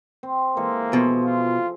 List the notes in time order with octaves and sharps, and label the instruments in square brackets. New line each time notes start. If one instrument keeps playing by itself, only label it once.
[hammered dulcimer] C4
[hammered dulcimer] E3 G#3 A4 [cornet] A#3
[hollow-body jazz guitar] B2 [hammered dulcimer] F3 G#3
[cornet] F4